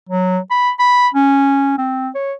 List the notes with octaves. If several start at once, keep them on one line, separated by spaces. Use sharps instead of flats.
F#3
B5
B5
C#4
C4
C#5